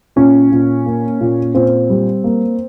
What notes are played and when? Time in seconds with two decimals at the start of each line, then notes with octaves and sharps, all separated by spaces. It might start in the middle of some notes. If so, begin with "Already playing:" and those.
0.16 A#2 C#4
0.52 A#2
0.86 A#3
1.21 A#2
1.55 A#2 C4
1.89 G3
2.24 A#3